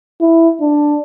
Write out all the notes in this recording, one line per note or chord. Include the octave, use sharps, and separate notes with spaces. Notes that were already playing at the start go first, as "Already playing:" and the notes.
E4
D4